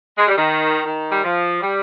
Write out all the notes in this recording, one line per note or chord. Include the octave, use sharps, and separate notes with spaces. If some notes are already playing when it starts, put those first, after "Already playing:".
G#3
G3
D#3
D#3
G3
F3
G3